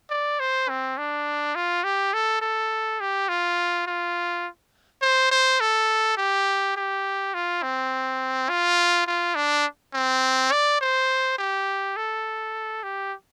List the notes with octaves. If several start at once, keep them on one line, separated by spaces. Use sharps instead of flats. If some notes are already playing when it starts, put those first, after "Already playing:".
D5
C5
C4
D4
F4
G4
A4
A4
G4
F4
F4
C5
C5
A4
G4
G4
F4
C4
F4
F4
D4
C4
D5
C5
G4
A4
G4